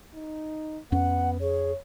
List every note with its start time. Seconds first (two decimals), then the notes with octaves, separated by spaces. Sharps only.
0.14 D#4
0.92 F2 B3 C#4 F#5
1.41 G#4 C#5